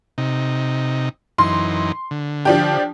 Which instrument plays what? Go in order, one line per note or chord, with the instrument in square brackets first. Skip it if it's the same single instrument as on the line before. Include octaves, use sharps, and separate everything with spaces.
[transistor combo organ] C3 D#4
[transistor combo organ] F#2 E3 D#4 [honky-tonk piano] C6
[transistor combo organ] D3
[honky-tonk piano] F3 D4 G4